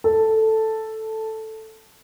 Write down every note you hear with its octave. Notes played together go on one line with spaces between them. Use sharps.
A4